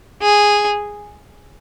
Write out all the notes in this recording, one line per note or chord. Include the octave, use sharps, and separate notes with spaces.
G#4